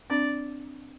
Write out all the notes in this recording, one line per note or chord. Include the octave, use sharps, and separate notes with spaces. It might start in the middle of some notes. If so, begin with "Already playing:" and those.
C4 D4 D5